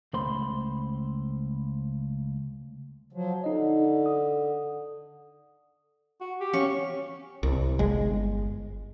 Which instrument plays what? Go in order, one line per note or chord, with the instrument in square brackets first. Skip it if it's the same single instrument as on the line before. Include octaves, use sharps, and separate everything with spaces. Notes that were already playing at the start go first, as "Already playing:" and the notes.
[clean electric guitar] C#2 A3 C5 B5 C6
[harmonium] F3 F#3
[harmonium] D3 [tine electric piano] D#4 D#5
[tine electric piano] D#6
[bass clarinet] F#4
G4
[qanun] C#4 F5 C#6
[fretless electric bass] C2
G1 G#3